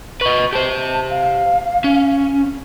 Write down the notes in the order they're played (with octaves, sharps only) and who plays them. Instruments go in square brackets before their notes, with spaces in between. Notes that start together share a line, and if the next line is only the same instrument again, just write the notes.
[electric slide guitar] B4 D#5 [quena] C#6
[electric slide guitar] G4 C5 [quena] A5
[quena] F5
[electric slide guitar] C#4